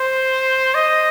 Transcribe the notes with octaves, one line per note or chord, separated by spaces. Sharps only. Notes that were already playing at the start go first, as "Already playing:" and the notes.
Already playing: C5
D#5